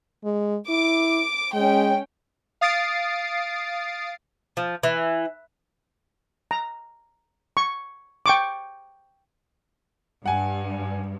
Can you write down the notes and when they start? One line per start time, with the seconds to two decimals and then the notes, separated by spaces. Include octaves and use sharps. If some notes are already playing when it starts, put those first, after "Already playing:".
0.24 G#3
0.69 E4 D6
1.55 G#3 C#4 G5
2.61 F5 D#6 A6 C7 D7
4.57 F3
4.83 E3
6.51 A#5
7.57 C#6
8.26 G5 C#6 D6
10.26 G2 F#5 G#5